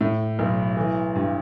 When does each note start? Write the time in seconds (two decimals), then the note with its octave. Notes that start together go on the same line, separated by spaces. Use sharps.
0.01 A2
0.39 B1
0.77 E3
1.15 G2